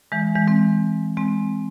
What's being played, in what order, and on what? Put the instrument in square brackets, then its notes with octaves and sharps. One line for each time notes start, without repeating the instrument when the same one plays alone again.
[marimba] E3 G#3
E3 G#3
G#3 C4
G#3 C4